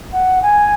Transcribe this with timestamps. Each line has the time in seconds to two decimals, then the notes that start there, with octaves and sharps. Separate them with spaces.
0.12 F#5
0.42 G#5